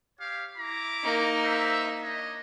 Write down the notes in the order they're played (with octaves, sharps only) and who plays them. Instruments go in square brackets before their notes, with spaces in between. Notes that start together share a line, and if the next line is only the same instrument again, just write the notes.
[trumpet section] G4 C#5 F5
E4 A#5 D6
[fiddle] A#3 D#4
[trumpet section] C5 E5
D4 C#5 D#5